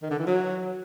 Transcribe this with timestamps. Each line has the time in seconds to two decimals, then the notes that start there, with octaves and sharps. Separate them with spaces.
0.03 D#3
0.11 D3
0.19 E3
0.27 F#3